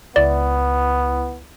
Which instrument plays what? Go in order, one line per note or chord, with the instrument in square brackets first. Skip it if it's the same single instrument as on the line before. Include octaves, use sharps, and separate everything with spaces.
[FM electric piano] C#2 E4 [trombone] B3 [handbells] D5